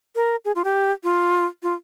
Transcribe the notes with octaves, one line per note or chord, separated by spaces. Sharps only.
A#4
G#4
F4
G4
F4
F4